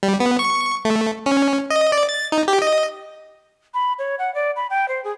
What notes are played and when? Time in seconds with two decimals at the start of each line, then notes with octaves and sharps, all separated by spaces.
0.03 G3
0.20 B3
0.39 C#6
0.85 A3
1.26 C#4
1.70 D#5
1.92 D5
2.09 A6
2.32 D#4
2.48 G4
2.62 D#5
3.74 B5
3.99 C#5
4.19 F#5
4.35 D5
4.56 B5
4.70 G5
4.88 C5
5.04 G#4